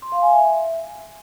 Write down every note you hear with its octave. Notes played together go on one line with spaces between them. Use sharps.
C6
F5
G#5
E5